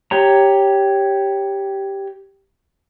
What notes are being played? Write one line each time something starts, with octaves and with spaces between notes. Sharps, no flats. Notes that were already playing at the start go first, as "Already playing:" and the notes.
G4 C#5 A#5